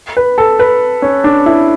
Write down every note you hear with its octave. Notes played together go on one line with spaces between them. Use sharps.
B4
A4
B4
C#4
D4
E4